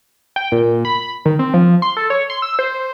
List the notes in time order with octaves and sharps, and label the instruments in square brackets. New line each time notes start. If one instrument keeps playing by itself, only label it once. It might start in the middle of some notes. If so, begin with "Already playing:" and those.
[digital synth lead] G5
A#2
B5
D#3
C4
F3
C6
A4
C#5
C6
E6
C5